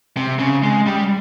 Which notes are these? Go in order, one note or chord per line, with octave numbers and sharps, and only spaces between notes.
C3
C#3
G#3
G3